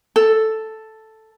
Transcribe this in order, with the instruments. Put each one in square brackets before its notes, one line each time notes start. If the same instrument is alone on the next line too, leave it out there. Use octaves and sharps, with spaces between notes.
[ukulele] A4